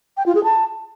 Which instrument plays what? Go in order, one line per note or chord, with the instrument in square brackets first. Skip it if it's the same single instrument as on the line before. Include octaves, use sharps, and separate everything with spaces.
[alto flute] G5
F4
G#4
A5